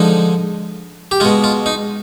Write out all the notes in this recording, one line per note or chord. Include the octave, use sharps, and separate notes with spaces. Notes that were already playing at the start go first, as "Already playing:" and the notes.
Already playing: D3 F3 G#3 D#4
G4
B2 G#3 F4
F4
D#4